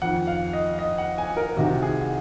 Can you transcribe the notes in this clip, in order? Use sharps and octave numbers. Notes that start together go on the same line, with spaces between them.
F2 D#3 F#5
F5
D#5
D#5
F#5
G#5
A#4
C2 C3 D#3 F#4
G#4